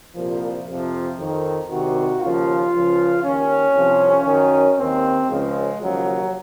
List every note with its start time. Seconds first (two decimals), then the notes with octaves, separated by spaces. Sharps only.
0.15 C2 A#2 F3
0.66 F2 C3 F3
1.18 F2 D#3
1.69 C2 C3 D#3 F#4
2.20 D#2 C#3 F3 F4
2.72 C#2 C#3 F3
3.23 D#2 D#3 C#4
3.74 C2 C3 F3
4.26 F#2 D#3
4.77 D#2 D#3 C4
5.28 C#2 C#3 F3 G#3
5.79 D#2 C#3 F3 F#3